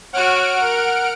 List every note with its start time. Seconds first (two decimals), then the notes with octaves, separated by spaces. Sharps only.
0.13 F#4 C#5 F#5 F6 D7
0.61 A#4